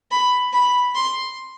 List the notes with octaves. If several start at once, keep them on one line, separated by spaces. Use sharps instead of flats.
B5
B5
C6